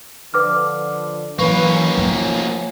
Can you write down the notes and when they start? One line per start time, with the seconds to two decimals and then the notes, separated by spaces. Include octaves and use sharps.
0.34 D3 F3 B4 D6 F6
1.39 E3 F#3 A#3 C#4 B4 C#6
1.98 F3 A3